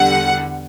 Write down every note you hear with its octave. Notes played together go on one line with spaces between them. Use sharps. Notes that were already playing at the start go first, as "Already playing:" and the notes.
Already playing: E2 D3 G3 F#5